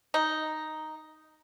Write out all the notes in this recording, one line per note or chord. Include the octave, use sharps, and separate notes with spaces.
D#4